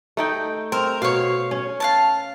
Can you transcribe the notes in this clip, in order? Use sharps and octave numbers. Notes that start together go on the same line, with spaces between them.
A3 D#4 G5
C4 A#4
B2 C#5 F5
C#4
F5 F#5 A5